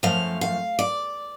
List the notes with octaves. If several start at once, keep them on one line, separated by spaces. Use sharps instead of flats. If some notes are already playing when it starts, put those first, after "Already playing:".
F#2 F3 A3 F5
F5
D5